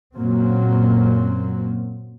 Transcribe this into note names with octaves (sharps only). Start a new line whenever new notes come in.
F#2 A#2 F#3 A#3 C4